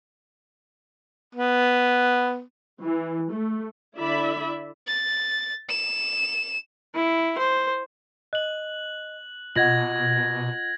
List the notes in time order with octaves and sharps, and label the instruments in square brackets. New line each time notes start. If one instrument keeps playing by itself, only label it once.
[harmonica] B3
[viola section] E3
A3
D3 E4 D5 E5 B5
[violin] A6
E7
[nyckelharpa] E4
C5
[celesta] D#5 [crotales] F#6 F#7
[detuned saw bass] B2 [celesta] F4 D#5 F#5 [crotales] G#6 A#6 F#7